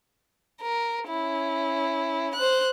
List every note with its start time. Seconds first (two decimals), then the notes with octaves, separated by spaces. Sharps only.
0.62 A#4
1.08 C#4 E4
2.35 C5 F#6